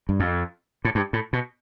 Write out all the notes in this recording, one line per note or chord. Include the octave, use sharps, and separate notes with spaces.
G2
F2
A2
G2
A2
B2